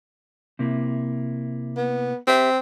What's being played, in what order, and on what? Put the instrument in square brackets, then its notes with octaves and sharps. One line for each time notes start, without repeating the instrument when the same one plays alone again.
[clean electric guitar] C3 A#3 E4
[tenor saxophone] B3
[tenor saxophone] C4 [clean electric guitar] G4 E5